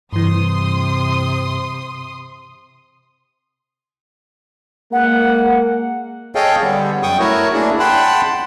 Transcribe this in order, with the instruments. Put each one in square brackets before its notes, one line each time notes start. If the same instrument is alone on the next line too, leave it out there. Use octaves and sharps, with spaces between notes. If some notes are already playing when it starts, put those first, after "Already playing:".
[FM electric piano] G2 E3 [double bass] C3 [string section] C6 D#6
[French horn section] G#3 A#3 [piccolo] F#5
[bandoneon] G#4 A4 C#5 D#5 F5 G5
D3 G3 B3
F#2 G5 C#6 D#6
A3 E4 F#4 A#4 C#5
A#3 D4 E4 G#4
F#5 G5 A5 B5 C6 F#6